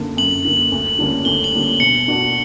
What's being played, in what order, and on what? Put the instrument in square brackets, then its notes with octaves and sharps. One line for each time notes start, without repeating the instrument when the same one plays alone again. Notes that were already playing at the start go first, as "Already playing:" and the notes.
Already playing: [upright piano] F#2 D3 A#3
[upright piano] F#2 [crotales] F#7
[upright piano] D3 A#3
D2
D3 G3 A#3 C#4
[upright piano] D2 [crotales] G7
[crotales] F#7
[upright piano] D3 G3 A#3 C#4
[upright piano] B2 [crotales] C#7
[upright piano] A#3 D4 F#4